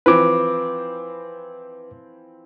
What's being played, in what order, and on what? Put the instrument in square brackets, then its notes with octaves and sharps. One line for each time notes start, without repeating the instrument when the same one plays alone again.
[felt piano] E3 F3 C4 [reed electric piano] B4 D6